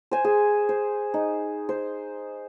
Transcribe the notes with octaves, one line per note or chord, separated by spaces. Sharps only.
C5 G#5
G#4
C5
D#4
C5